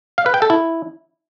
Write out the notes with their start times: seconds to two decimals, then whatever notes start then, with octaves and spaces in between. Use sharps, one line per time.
0.18 F5
0.26 B4
0.34 G5
0.42 A4
0.50 E4